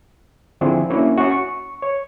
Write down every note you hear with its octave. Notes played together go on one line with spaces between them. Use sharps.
D3 F3 C4 D4 E4 G#4
A#3 C#4 D4 E4 F#4
C#4 F#4
C#6
C#5